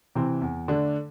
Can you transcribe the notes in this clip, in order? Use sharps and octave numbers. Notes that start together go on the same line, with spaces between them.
C3 E3 C4
E2
D3 A3 D4